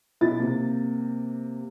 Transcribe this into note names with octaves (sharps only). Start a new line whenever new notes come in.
B1 E4 A6
C3 A#3